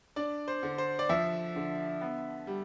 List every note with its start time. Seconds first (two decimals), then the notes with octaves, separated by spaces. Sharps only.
0.16 D4 D5
0.48 C5
0.63 D3
0.78 C5
0.99 D5
1.09 F3 E5
1.56 D3
2.01 B3
2.47 G3